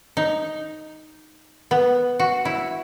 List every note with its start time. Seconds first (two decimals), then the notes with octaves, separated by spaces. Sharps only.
0.17 D#4
1.71 B3
2.19 F#4
2.45 E4